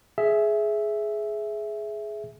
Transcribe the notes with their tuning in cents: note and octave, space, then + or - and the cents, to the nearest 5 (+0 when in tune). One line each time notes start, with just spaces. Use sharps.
G#4 +15 E5 +0